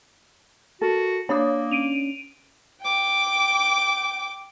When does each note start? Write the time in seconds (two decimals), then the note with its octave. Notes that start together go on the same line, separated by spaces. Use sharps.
0.81 F#4 A4 A#4
1.29 A#3 D4 C#5 B5 D#6
1.71 C#4 D7 D#7 F7
2.83 G5 D6